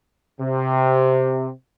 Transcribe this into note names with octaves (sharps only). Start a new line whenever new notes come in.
C3